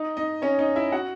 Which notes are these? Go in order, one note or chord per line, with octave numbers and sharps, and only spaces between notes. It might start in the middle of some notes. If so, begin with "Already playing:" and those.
Already playing: D#4 D#5
D#4 D#5
C#4 C#5
D#4 D#5
E4 E5
F#4 F#5